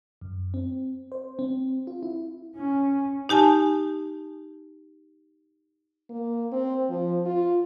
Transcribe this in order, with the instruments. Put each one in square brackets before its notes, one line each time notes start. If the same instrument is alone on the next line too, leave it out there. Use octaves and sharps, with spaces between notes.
[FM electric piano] F#2
C4
C5
C4
F4
E4
[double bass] C#4
[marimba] D#4 G4 G#5 A5
[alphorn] A#3
C4
F3
F4